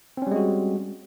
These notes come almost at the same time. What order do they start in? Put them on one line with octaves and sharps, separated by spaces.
C4 C#4 G3 G#3 F#4